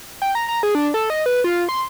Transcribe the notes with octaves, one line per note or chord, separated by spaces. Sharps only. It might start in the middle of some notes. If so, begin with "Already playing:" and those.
G5
A#5
A#5
G#4
D4
A4
D#5
B4
F4
C6